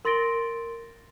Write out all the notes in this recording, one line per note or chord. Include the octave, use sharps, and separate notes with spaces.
A#4 C6 A6 A#6 D7 G7